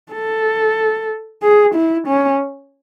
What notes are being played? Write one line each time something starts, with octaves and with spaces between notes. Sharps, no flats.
A4
G#4
E4
C#4